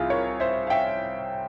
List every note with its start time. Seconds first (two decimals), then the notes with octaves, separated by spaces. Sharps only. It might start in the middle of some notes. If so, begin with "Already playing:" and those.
Already playing: C2 C3 E4 F4 G#4
0.10 A#4 C#5
0.40 C5 E5
0.67 F5
0.70 E5 G5